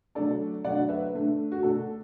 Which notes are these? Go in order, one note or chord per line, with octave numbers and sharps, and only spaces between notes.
D3 F#3 A3 D4 A4 D5
D3 F#3 A3 D4 D5 F#5
B4 E5
D3 A3 D4
F#4
D3 A3 D4 A4